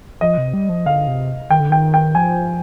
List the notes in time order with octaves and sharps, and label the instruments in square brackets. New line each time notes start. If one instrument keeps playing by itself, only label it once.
[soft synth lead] F3 [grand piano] D#5
[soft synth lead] C3
G3
F3
[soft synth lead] D3 [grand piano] F5
[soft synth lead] C3
[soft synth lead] D#3 [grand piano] G5
[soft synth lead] D3
[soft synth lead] D#3 [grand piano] G5
[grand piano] G5
[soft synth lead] F3 [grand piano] G#5